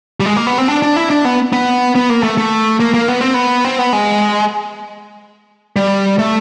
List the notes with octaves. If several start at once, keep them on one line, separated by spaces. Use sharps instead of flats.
G3
G#3
A#3
B3
C4
D4
D4
E4
D4
B3
B3
B3
A#3
A3
A3
A#3
A#3
B3
C4
B3
C4
B3
G#3
G3
A3